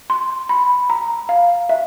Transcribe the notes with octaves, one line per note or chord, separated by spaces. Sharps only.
C6
B5
A#5
F5
E5